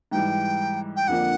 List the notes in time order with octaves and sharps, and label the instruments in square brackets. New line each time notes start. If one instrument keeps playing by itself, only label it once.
[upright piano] G#2 E3 G3 [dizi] G5
[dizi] G5
[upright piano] F2 D3 F3 A#3 D4 [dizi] F#5